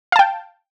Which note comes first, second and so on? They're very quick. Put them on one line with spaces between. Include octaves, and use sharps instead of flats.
F5 A5 G5